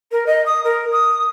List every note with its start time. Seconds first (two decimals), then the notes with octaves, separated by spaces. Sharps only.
0.12 A#4
0.27 D#5
0.46 D#6
0.64 A#4
0.92 D#6